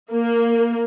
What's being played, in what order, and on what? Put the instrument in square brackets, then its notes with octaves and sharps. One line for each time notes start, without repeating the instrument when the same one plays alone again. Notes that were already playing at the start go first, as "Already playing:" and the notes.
[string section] A#3